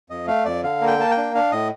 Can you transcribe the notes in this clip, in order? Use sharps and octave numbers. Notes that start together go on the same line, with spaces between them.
F2 D#5
A3 F5
F2 D5
D3 F5
A#3
G5
A#3 A5
G5
D4
D4 F5
A2 D#5